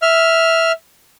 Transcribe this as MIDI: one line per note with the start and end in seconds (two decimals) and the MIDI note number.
0.02 0.72 76
0.02 0.72 89